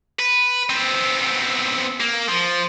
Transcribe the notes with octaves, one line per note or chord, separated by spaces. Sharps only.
B4
B3 C4
A#3
F3